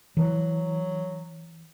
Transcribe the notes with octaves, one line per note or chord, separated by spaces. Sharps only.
E3 F#3